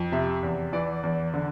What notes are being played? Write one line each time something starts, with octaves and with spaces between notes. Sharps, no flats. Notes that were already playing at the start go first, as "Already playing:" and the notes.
Already playing: F2
C3 E5
E2
E3 D5
E2
D3